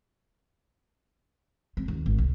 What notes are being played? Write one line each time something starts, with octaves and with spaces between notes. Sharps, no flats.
C4
D#2
G#1
C2